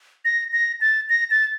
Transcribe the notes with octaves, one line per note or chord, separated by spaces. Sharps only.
A#6
A#6
A6
A#6
A6